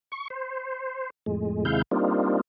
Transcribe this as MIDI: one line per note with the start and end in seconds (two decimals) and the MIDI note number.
0.12 0.28 85
0.30 1.10 72
1.26 1.65 41
1.26 1.65 45
1.26 1.65 56
1.65 1.82 39
1.65 1.82 48
1.65 1.82 56
1.65 1.82 64
1.65 1.82 77
1.65 1.82 91
1.91 2.41 55
1.91 2.41 58
1.91 2.41 60
1.91 2.41 62
1.91 2.41 63
1.91 2.41 65